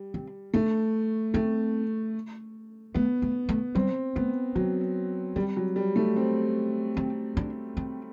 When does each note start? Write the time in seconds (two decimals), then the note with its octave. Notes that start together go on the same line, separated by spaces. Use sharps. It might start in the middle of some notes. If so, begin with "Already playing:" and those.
Already playing: G3
0.14 C4
0.54 A3 D4
1.34 A3 C4
2.94 A3 B3
3.22 A3
3.49 A3
3.75 G3 C4
4.16 A3 B3
4.55 F#3 C4
5.36 G3 C4
5.57 F#3
5.76 G3
5.96 A3
6.16 C4
6.97 C4
7.37 D4
7.77 C4